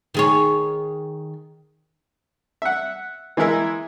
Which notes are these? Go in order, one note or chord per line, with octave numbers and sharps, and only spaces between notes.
D#3 G#4 C#5
E5 F#5
E3 G#3 E4 A#4 E5